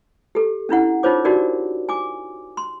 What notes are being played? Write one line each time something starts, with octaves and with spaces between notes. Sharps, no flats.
G4 A4
C#4 D4 E4 F#5
D#4 F4 A#4 C5 C#5 D6
D4 D#4 F#4 G4 A#4 D5
G#5 D6
C6